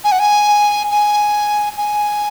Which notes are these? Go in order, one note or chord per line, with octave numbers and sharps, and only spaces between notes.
G#5
F#5
G#5
G#5
G#5